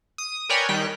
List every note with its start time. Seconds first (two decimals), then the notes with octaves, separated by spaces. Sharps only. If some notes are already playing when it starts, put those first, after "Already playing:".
0.18 D#6
0.49 A#4 B4 C#5 D5 G5 G#5
0.69 D#3 G3 G5 F#6